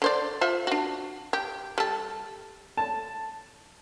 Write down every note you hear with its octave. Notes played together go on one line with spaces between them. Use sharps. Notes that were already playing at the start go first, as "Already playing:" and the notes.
D3 C5 D5
F4 C5 E5
D4 F#4
G4
G3 A4
A5